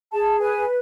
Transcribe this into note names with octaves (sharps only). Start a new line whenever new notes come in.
G#4 A5
B4 G#5